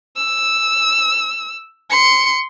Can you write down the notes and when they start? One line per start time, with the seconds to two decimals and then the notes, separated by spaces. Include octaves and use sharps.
0.17 E6
1.90 C6 C#7